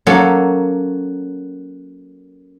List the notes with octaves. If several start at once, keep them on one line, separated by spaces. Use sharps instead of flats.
F#3 A#3 C#4 A4